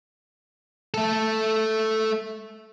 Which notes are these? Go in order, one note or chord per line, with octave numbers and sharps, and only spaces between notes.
A3 A4